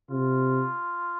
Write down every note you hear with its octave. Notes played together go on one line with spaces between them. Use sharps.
C3 F4